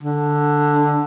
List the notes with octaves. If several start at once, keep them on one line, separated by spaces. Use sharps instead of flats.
D3